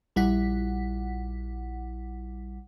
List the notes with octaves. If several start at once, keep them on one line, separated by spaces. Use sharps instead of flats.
A#1 G3 E4 F#5 B6